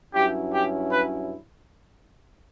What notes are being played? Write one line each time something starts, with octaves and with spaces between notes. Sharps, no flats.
G2 F#3 C#4 E4 G4
G4
B4